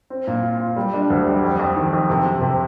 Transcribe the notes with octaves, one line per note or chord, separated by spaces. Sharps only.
C4
A#2
F4
F4
G3
D4
D2
G3
F2
F2
D#3
F2
C3
C3
C3